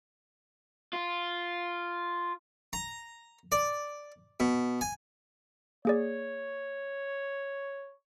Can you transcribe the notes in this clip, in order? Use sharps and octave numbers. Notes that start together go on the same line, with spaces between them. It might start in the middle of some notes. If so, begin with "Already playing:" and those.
F4
A#5
D5
B2
G#5
A#3 G#4 C#5 D5